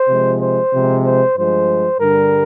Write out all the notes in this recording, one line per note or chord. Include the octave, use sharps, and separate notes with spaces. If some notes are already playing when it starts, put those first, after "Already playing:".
Already playing: C5
C3 F3 G#3
C5
C3 F3 G#3
C5
G2 F3 G#3 C5
G2 D3 G3 A#4